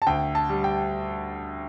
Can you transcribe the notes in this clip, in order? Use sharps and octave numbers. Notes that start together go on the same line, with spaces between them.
A5
D2 G5
A5
G3
G5